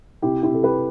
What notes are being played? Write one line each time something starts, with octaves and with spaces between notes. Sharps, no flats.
C3 E4 G4
E4 G4
C3 A4
G4 B4